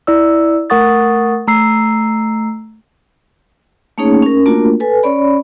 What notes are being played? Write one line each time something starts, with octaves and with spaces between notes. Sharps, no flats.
E4 D5 E6
A3 A#4 F#5 C#6 D#6 A6
A3 A#5 E6 C7
A3 A#3 C#4 D#4 G#4 C#5
C#4 A#4
A3 A#3 D4 F4 F#4 A#4
A4 B4 G#5
C#4 C#5 D5 B5